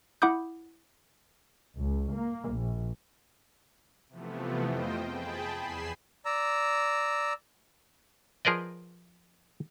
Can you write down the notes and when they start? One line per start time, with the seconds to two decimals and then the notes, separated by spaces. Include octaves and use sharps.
0.22 E4 F#5 B5 D6 D#6 G6
1.77 C#2
2.13 A#3
2.52 A#1
4.09 C3 E3 F3 A3 B3
4.64 F2 F4 C5 D#5 G5
5.07 G#4 G5 A5 B5
5.56 E2 G#5 B5 C7 E7
6.25 D5 A#5 E6
8.45 F3 G#4 A#4 B4 D5 D#5